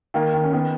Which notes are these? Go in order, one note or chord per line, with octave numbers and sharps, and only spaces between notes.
D#3 A#3
D#3
C#4
D#3 B3